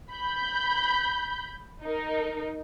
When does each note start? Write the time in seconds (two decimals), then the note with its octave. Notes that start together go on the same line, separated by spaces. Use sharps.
0.13 B5 G6
1.83 D#4 A#4